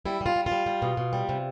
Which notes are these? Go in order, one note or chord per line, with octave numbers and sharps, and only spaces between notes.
G3 E4
G3 F4
G3
F4
G3
G3
B2
B2
G3
C3